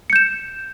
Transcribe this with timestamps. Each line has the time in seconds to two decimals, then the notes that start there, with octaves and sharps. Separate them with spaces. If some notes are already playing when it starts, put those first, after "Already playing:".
0.10 C#7
0.13 G6
0.16 E7